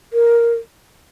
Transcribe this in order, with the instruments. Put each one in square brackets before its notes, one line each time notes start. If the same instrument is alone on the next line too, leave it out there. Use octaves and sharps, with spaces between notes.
[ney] A#4